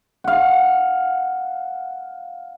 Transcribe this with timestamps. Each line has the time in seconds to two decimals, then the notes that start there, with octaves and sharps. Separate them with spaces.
0.24 F5 F#5